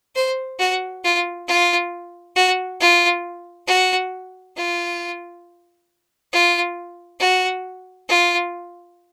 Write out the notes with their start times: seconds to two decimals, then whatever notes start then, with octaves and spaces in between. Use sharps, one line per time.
0.15 C5
0.59 F#4
1.04 F4
1.48 F4
2.36 F#4
2.80 F4
3.67 F#4
4.56 F4
6.32 F4
7.20 F#4
8.09 F4